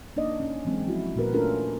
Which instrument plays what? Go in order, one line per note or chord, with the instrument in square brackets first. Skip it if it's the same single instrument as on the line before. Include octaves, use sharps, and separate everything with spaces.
[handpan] A#3 D4 D#4 D5 D#5
C#4
E3 F#3 G#3 C4
F3 F#3 E4 F#4
A#2 A#3 F#4 A#4 B4
A3 C#4 D4 F4 A4 A#4